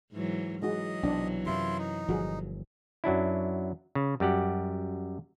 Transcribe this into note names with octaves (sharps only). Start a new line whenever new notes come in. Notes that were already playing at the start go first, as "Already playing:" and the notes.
G#2 E3 F#3
E3 F#3 G#3 D#4 F#4 D#5
B1 C3 C4 D4
F#2 C3 E4 F4 C6
D#4
G1 A#2 F3 F#4 G#4
F#2 F#3 D4 E4
C#3
F#2 G3 G4 F#5